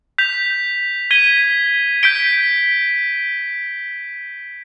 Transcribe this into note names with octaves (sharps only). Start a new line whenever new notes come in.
G6 B6 F7
G#6 B6 D#7 G7
G6 B6 D7 G7